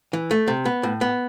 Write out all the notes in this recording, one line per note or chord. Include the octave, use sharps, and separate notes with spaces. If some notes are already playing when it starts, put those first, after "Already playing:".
E3
A3
C3
B3
A2
B3